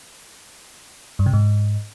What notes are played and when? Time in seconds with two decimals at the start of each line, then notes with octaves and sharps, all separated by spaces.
1.19 G2
1.26 C3
1.33 G#2